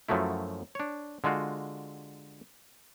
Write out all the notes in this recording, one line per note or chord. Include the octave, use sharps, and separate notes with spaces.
F#2 F3 F#3 A3 E4
D4 C#5
D3 G#3 F4 F#4